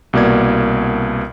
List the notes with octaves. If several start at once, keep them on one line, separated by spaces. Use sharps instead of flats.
C2 B2 A#3 D5 G#6